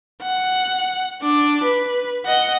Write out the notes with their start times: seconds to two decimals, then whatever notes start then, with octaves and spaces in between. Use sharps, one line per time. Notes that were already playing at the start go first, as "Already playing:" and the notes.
0.22 F#5
1.22 D4 D6
1.64 B4
2.26 D#5 F#5